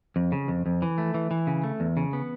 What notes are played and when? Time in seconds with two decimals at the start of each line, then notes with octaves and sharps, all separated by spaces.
0.16 F2
0.32 C#3
0.48 F2
0.66 F2
0.82 E3
0.98 A3
1.14 E3
1.31 E3
1.47 C#3
1.63 A3
1.80 E2
1.97 C#3
2.13 B3